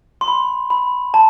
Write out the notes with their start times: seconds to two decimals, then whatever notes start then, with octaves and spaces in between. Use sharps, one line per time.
0.21 C6
0.28 B5
0.70 B5
1.14 A5